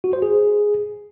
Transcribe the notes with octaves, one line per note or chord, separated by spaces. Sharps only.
F#4
C5
G#4